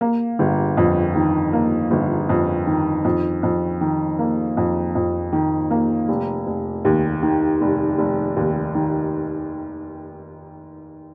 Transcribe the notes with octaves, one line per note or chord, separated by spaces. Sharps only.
A#3
G1
F2
D#3
A#3
G1
F2
D#3
F2
F2
D#3
A#3
F2
F2
D#3
A#3
F1
F1
D#2
D#3
F1
F1
D#2
D#3